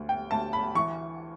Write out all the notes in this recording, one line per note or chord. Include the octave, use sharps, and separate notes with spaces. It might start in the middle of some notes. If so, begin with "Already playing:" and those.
Already playing: D2
G5
D2 A5
B5
E3 C#6